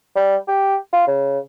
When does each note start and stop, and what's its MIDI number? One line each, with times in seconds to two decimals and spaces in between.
0.15 0.36 55
0.48 0.76 67
0.93 1.04 65
1.07 1.39 49